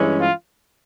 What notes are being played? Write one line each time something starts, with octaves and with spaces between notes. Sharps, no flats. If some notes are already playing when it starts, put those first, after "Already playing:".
Already playing: G2 E3 G#3 C#4
F4